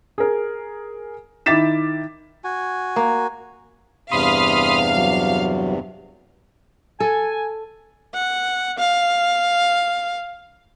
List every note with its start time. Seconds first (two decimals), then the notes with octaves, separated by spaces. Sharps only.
0.18 G#4 A#4
1.46 D#3 E4 D6 A6 B6 E7
2.44 F#4 G#5
2.96 A#3
4.11 E2 G2 C3 F5 B5 C6 D#6
4.97 F#3
7.00 A4 G#5
8.14 F#5
8.78 F5